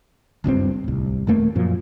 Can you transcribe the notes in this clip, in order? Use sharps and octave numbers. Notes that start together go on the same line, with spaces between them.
F#1 C#2 G2 C4
D1 C2
D#1 F2 A3 A#3
F#2 A#2 F3